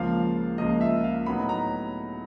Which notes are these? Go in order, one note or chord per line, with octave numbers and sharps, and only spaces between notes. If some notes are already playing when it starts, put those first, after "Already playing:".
Already playing: C#2 C#3 F3 A#3 F5
C#2 C#3 F3 A#3 D#5
E5
F5
A2 F#3 B3 D#4 B5
A#5